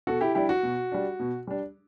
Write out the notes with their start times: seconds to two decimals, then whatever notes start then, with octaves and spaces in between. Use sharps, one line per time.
0.07 B2 F#4 A4
0.21 E4 G4
0.35 G3 D4 E4 G4
0.49 F#4
0.63 B2
0.92 G3 D4
1.20 B2
1.47 G3 D4